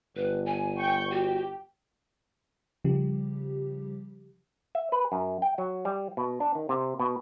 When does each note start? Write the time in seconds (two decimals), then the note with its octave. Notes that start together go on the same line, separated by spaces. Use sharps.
0.16 G1 B4
0.46 G#5
0.78 G5 C#6 G6
1.12 F#4 G4 G5
2.85 C#3 F3 G3 G4
4.75 E5
4.92 B4
5.12 F#2
5.42 G5
5.58 F#3
5.85 G3
6.17 B2
6.40 D4
6.55 D#3
6.69 C3
7.00 B2